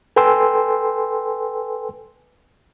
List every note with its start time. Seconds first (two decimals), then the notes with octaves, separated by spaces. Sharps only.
0.16 A4 B4 G5 G#5 C6 E6